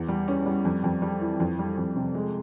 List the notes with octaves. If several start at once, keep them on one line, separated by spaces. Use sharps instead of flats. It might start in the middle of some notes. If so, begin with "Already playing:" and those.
Already playing: E2
G3
C#4
G3
F2
F2
G3
E3
F2
G3
F2
C3
G#3